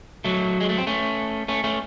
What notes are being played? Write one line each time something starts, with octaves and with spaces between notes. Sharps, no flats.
F#3 A3
G#3
A3
C4
A3 C#4
A3 C#4
A3 C#4